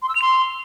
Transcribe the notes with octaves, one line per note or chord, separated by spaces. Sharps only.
C6
E6
F7
C6